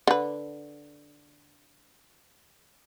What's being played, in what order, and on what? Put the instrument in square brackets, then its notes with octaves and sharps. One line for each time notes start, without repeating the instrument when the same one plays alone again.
[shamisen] D3 B4